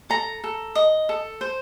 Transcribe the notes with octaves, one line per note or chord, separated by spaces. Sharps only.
A4 A#5
A4
D#5
A4
C5